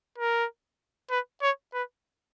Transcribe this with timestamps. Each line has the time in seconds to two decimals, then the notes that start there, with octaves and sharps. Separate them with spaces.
0.18 A#4
1.10 B4
1.42 C#5
1.73 B4